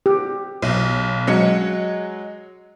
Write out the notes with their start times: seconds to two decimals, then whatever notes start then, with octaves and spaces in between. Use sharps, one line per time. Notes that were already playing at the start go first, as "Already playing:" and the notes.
0.06 G4
0.62 B1
1.27 F#3 G#3 C#7